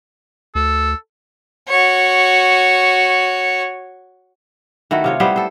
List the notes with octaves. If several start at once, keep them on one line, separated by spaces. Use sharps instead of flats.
D2 A4
F#4 C#5
D#3 A3 E4 F#4
C3 F4 C#5
G3 B3 E4 C5
A4 C5